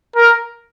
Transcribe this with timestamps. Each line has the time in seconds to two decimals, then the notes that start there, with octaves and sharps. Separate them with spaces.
0.16 A#4